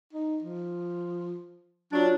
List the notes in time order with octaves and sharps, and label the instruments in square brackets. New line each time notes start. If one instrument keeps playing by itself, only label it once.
[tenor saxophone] D#4
F3
[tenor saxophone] F#3 [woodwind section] D4 [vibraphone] F4 C#5